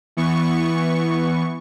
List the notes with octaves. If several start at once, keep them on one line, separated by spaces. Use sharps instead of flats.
E3 B3 C#6